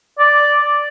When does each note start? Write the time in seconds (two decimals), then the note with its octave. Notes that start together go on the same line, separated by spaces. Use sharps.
0.19 D5